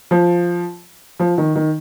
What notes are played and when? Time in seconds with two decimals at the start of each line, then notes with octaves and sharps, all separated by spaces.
0.11 F3
1.20 F3
1.38 D#3
1.56 D#3